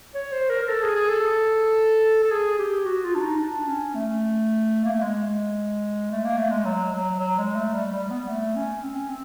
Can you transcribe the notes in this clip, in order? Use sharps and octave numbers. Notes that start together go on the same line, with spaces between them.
C#5
C5
A#4
A#4
A4
G#4
G#4
A4
A4
G#4
G4
F#4
F4
D4
D#4
D4
C#4
A3
A#3
A3
G#3
A3
A#3
A3
G#3
F#3
F#3
F#3
G#3
A3
G3
G3
B3
A3
C#4
C4
C#4
C4